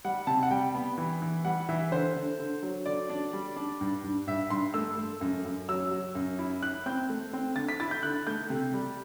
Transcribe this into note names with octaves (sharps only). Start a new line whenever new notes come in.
G3 F#5
C3 A5
F#5
G3 G5
B3
E3
E3
G3 F#5
E3 E5
D3 C5
D3
D3
F#3
D3 D5
D4
G3
D4
G2
G2
G2 E5
G2 C6
A3 E6
A3
F#2
F#2
F#3 E6
F#3
F#2
E4
E4 F#6
C4 G6
A3
C4
D3 A6
B6
E4 A6
G6
D3 F#6
A3 G6
C3
G3